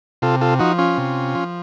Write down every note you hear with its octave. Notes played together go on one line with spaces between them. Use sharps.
C3 F4 A4
F4 A4
F3 D#4 F#4
C#4 F4
C3
F3